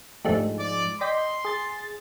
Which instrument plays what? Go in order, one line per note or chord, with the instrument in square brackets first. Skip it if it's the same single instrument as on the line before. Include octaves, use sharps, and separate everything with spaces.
[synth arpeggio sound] G#2 F3 G#3 [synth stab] A3 D4 G4
[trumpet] D5
[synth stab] D5 G5 B6 [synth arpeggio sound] D#5 [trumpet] C6
[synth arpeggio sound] G#4 A6